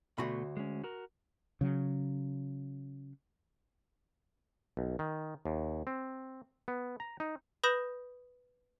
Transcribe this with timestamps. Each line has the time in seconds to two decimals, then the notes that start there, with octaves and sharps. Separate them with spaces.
0.18 D2 B2 A3 F#4 B5
0.57 G#3 C#4
0.84 F#4 A#4
1.61 C#3 F#3
4.77 B1
4.99 D#3
5.45 D#2
5.87 C4
6.68 B3
7.00 A#5
7.20 D#4
7.63 B4 B5 D#6 G6 A#6 E7